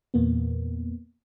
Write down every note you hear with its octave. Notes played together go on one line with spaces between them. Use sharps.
E2 A#2 A#3 B3